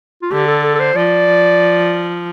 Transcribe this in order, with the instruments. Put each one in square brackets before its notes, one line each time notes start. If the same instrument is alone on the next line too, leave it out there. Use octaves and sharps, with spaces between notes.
[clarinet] F4
[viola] D3 [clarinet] G4
[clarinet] A4
A4
A4
C5
[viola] F3 [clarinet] D5